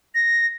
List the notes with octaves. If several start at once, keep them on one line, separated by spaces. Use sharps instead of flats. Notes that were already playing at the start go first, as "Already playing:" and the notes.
A#6